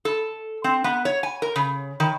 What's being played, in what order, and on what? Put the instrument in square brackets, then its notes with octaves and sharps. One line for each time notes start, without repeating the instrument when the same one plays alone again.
[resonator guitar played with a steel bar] A4
C4
B3
C#5
G#5
A#4
C#3
D#3